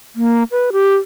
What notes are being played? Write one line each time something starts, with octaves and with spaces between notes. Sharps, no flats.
A#3
B4
G4